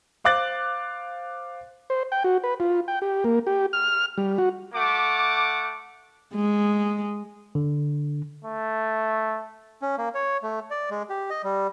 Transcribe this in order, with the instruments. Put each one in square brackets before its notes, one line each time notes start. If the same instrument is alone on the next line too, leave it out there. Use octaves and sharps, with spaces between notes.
[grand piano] C5 F5 D6 F#6 A6
[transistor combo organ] C5
G5
F#4
B4
F4
G5
G4
A#3
G4
F6
G3
F#4
[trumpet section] A3 F#5 D6
[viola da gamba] G#3
[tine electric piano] D3
[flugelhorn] A3
[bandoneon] C#4
A#3
C#5
A3
D5
G#3
G4
D#5
G3